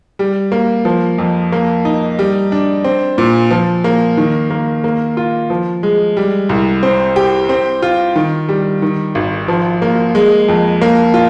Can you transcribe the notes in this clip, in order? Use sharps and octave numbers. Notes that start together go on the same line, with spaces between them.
G3
A#3
F3
F2
A#3
D#4
G3
D4
C4
A#2
F3
A#3
D#3
A#3
A#3
F4
F3
G#3
G3
C2
C4
G4
C4
F4
D#3
G3
D#3
G#1
F3
A#3
G#3
F2
A#3
F4